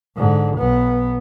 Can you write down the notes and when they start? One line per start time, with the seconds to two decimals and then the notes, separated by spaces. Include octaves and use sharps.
0.17 G#2 D3
0.57 B1 B3